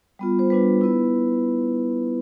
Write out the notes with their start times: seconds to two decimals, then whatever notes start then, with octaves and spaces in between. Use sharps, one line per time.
0.19 G3 B3 F4
0.39 C5
0.50 G3 B3 D4 F4 B4
0.81 B3 E4